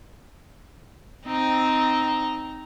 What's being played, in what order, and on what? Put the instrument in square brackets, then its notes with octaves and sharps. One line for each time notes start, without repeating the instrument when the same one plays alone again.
[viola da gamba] C4 [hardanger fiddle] D#4